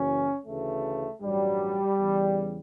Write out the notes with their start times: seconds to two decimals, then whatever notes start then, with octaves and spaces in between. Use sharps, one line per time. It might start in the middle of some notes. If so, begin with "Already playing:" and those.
Already playing: F#1 F#2 E3 C#4
0.45 D2 C#3 E3 A3
1.22 A1 G2 F#3 G3
1.98 E2 C#3 E3